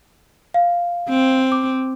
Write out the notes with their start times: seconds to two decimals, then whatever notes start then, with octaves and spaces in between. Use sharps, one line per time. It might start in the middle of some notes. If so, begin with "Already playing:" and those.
0.54 F5
1.09 C4
1.52 D6